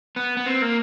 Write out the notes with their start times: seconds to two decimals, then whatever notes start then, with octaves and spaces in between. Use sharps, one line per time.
0.16 B3
0.37 B3
0.46 C4
0.62 A#3